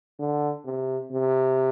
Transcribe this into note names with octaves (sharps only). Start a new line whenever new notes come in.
D3
C3
C3